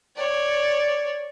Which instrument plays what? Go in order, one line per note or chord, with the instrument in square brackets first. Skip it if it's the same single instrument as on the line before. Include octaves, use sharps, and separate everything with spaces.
[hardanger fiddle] C#5 D5